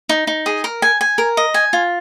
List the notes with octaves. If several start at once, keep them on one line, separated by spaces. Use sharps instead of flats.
D#4
D#4
G#4
A#4
G#5
G#5
A#4
D#5
G#5
F4